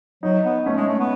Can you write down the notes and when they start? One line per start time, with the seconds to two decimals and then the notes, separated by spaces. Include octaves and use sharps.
0.23 F#3 D#4
0.45 B3
0.66 A3 C#4
0.77 G#3
0.88 A3
0.99 B3